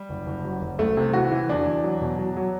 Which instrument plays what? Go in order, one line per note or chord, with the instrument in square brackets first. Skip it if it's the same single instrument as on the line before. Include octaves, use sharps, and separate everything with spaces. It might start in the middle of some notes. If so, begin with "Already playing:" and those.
Already playing: [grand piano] G3
F#1
F#1
F#3
F#1
C2 A3
C3
E3 F#4
E3
E2 D4
E2
F#3
B2
F#3
F#3